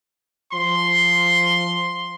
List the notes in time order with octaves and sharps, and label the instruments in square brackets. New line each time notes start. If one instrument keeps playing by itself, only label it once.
[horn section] F3 C6